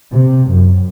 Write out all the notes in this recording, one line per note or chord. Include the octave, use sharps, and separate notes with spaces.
C3
F#2